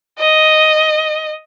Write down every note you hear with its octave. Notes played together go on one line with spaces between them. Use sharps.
D#5